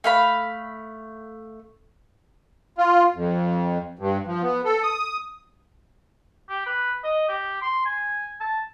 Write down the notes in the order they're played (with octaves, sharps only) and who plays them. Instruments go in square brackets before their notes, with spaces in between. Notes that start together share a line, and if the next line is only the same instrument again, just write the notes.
[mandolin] A3 F5 B5
[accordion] F4
F2
G2
F3
B3
A4
D#6
[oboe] G4
B4
D#5
G4
C6
G#5
A5